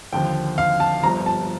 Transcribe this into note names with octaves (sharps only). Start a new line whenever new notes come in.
D#2 D3 F3 G5
F5
A5
G1 G2 F3 A#5
A5